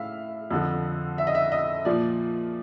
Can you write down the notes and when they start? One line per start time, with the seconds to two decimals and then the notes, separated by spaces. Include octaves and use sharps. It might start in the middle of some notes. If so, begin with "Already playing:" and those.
Already playing: A2 E5 F5
0.51 F2 D3 F3
1.18 E5
1.27 D#5
1.35 E5
1.52 D#5
1.85 A#2 F3 D5